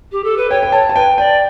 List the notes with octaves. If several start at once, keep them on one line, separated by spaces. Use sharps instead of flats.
G4
A4
B4
C#5 G5
G5
C#5 A5
A5
B4 G5
D5 G5